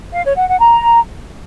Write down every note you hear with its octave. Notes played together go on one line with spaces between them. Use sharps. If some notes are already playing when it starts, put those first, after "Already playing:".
F5
C#5
F#5
F#5
A#5